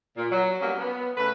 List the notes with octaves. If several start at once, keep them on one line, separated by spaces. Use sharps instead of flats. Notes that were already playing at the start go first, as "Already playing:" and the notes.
A#2
F#3
F#3 G3 A#3 B3 C#4
B3
C#3 A3 B4